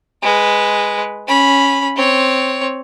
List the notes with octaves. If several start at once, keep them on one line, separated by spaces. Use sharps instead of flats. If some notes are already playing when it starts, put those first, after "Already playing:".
G#3 B4
C#4 B5
C4 C#5